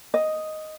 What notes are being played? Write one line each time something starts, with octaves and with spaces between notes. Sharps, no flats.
D#5